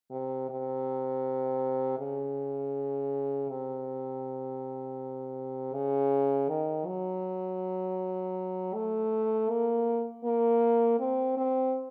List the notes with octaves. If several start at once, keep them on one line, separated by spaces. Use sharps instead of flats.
C3
C3
C#3
C3
C#3
D#3
F#3
A3
A#3
A#3
C4
C4